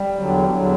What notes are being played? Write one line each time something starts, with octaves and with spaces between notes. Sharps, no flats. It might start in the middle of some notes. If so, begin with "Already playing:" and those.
Already playing: G3
E2 D3 F#3
E2 D3 F#3